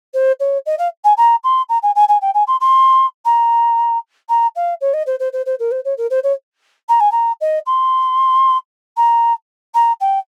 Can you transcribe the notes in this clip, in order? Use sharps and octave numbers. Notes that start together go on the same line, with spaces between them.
C5
C#5
D#5
F5
G#5
A#5
C6
A#5
G#5
G#5
G#5
G5
G#5
C6
C6
A#5
A#5
F5
C#5
D#5
C5
C5
C5
C5
A#4
C5
C#5
A#4
C5
C#5
A#5
G#5
A#5
D#5
C6
A#5
A#5
G5